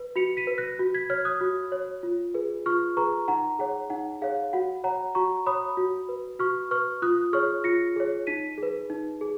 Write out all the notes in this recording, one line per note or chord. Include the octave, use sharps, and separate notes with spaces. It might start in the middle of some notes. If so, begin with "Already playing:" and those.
Already playing: B4
F#4 C#7 F7
B6 D#7
B4
F#6 A#6
F#4
G#6 B6
C#5 F6 G#6
D#6 F#6
F#4
C#5
F4
G#4 B4
F4 C#6 F6
G#4 B4 A#5 C#6
D#4 F#5 A#5
G#4 C#5 F#5
D#4 F#5
G#4 C#5 F5
F#4 F#5
C#5 F#5 A#5
F#4 A#5 C#6
C#5 B5 D#6
F#4
B4
F#4 C#6 F6
B4 C#6 F6
F4 D#6 F#6
G#4 C#5 C#6 F6
F4 A#6 C#7
G#4 C#5
D#4 B6 D#7
G#4
B4
D#4
G#4